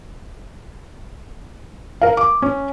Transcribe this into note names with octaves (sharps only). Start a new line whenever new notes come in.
A#4 F5
D6
C#4